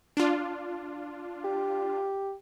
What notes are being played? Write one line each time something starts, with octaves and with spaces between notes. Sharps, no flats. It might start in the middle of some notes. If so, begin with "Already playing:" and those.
D4 F4
G4